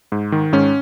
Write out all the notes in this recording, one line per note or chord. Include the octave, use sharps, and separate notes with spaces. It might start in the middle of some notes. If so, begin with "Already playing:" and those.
G#2
D#3
G#2 C#4